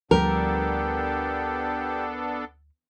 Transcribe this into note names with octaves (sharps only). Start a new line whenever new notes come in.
D2 F3 G3 B3 D4 G4 A4 A#4